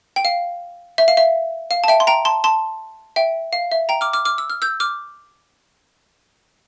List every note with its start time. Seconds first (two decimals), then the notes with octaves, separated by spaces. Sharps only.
0.16 G5
0.25 F5
0.98 E5
1.08 F5
1.17 E5
1.71 F5
1.84 A5
1.88 E5 G5
2.00 C6
2.07 G5 A#5
2.25 A5 C6
2.44 A5 C6
3.16 E5 G5
3.53 F5
3.72 E5
3.89 G5 A#5
4.01 D6 F6
4.13 D6 F6
4.25 D6 F6
4.38 E6
4.50 F6
4.62 E6 G6
4.80 D6 F6